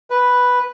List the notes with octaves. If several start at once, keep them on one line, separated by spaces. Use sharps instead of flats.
B4